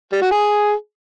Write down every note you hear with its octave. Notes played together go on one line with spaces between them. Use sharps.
G3
F#4
G#4